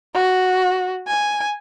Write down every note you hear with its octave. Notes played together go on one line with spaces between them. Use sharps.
F#4
G#5